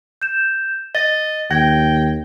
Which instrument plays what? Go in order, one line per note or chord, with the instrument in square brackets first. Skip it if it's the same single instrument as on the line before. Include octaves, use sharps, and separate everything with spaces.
[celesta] G6 E7
[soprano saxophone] D#5 [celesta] A6
[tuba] D#2 [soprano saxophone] G5 [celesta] G#6 A#6